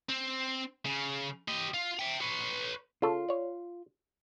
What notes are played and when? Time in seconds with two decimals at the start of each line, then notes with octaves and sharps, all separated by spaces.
0.09 C4
0.85 C#3
1.48 G4 D#5
1.74 F4
1.99 E5 G5
2.21 B4 C#5
3.02 C#3 F4 A4
3.29 C#5 D5